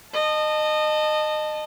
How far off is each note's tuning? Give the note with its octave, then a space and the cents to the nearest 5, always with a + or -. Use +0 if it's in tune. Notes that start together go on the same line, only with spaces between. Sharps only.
D#5 -25 A5 +0